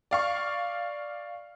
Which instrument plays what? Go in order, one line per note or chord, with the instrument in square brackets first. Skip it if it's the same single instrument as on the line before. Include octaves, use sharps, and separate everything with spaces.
[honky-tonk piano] D5 F5 C#6